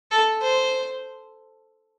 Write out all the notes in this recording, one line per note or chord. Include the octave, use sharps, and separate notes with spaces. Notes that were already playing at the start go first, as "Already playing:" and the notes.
A4
C5